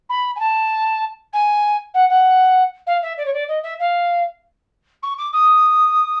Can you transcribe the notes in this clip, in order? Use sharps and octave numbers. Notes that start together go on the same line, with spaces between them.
B5
G#5
A5
G#5
F#5
F#5
F5
E5
D5
C#5
D5
D#5
E5
F5
C#6
D6
D#6